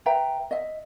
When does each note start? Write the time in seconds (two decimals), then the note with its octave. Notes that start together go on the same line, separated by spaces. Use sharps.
0.06 B4 E5 G5 A#5
0.51 D#5 E5